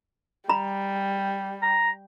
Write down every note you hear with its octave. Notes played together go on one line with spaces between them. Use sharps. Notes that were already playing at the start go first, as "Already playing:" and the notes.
G3 A#5 B5
A#5